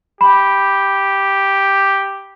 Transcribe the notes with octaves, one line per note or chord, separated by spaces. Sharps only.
G4 B5